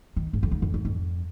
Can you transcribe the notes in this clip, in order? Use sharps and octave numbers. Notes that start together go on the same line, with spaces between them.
D#3
G#2
F2
G#2
F2
G#2
F2